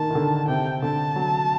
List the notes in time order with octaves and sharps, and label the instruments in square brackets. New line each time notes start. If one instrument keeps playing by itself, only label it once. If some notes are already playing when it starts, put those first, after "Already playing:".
Already playing: [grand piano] D#3 A#3 [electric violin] A5
[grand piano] D#3
D3
[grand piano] C3 [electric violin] G5
[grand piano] D3 [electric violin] A5
[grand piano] F#3